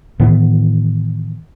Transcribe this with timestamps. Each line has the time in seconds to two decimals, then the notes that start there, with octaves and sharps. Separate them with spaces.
0.20 A2 D#3 E3 B3